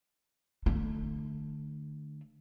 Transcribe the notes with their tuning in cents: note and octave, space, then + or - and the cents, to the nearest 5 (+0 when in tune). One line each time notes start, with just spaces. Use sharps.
D3 +30 A3 +0